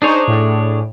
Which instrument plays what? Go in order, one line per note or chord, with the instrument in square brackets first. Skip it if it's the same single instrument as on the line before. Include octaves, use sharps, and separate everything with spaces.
[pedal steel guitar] D4 G#4 C#5 [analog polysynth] D#4 C5
[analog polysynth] A2